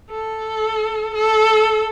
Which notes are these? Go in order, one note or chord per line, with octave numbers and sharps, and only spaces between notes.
A4
A4